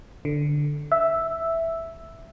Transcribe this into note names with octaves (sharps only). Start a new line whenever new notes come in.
D3
E5